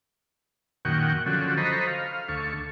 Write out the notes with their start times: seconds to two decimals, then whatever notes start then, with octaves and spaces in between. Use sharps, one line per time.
0.85 F#2 A#2 D#3 F#5 G5 C#6
1.26 D3 F3 F#3 C#4 F#4 A4
1.57 A4 C5 D#5 A#5 B5 C#6
1.87 F5
2.29 D2 A4 C#6